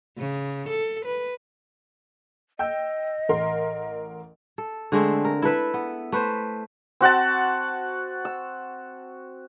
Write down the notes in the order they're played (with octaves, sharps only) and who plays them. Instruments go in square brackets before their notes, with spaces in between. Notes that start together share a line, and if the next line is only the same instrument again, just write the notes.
[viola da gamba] C#3
A4
B4
[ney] D#5 [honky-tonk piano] G5 E6 G6
[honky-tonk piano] A1 A#4 C6
[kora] A4
D3 G#3 A3 C4
A#4
E4 A4 B4 E5
B3
A3 B4 C5
[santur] C4 F#4 F#5 A5
E6